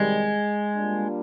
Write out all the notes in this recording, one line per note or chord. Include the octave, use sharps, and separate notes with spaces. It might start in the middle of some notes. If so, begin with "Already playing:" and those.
Already playing: C3 D#3 G3 G#3
G3 A#3 D4 F4